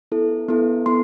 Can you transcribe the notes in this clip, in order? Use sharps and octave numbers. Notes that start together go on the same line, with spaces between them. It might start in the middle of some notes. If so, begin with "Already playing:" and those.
B3 E4 A4
B3 E4 A4
B3 E4 A4 C6